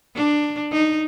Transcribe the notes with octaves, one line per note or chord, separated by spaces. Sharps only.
D4
D#4